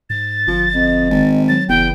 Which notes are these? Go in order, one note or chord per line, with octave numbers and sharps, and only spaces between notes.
G#2 A6
G1 F3
F2 D#5
G#1
F#3 A6
F#1 E2 B3 G5